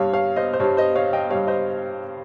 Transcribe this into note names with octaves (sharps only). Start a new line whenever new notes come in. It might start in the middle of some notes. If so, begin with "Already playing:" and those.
Already playing: G2 G3 C#5 F5
C#5 F5
C5 D#5
C5
G2 G3 C#5
C5 D#5
C#5 F5
D#5 G5
G2 G3 C#5 F5
C5 D#5